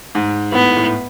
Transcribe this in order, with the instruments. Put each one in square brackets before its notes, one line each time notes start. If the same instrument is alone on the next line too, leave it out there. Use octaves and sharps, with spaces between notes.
[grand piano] G#2
[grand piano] A2 [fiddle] B3
[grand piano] A2